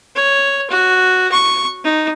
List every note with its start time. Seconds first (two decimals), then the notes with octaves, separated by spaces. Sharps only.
0.15 C#5
0.70 F#4
1.31 C#6
1.84 D#4